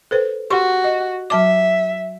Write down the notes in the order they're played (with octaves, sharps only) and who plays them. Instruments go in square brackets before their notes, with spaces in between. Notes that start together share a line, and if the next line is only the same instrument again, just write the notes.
[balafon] A4 B4 C5
[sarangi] F#4 [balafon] G4 C6 C#6
[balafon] D#5
[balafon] F#3 A5 D6 [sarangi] E5